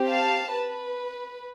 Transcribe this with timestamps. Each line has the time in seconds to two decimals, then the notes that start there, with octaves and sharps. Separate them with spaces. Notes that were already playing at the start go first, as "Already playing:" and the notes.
Already playing: C4 G4
0.09 F5 A5
0.53 B4